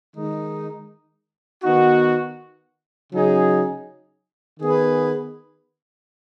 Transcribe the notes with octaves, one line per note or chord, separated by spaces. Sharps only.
D#3 G#3 D#4
D#3 B3 D#4 F#4
C#3 F#3 D#4 G#4
D#3 B3 G#4 B4